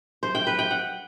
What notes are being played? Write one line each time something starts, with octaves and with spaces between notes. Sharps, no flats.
C5
G5
B4
G5
F#5